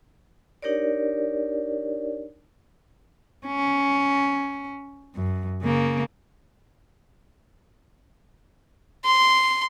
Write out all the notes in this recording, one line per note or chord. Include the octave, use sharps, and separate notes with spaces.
D4 D#4 G4 A#4 C#5 D5
C#4
F#2
C#3 A#3
C6